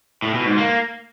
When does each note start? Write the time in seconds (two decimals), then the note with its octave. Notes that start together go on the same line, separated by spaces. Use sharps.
0.22 A2
0.34 B2
0.46 G#2
0.58 A#3